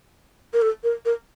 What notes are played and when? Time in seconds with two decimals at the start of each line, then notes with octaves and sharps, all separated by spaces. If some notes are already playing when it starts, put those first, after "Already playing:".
0.53 A#4
0.62 A4
0.84 A#4
1.05 A#4